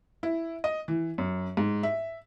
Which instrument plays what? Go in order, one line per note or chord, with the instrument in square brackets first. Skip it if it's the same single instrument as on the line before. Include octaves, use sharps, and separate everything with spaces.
[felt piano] E4
D#5
E3
F#2
G#2
E5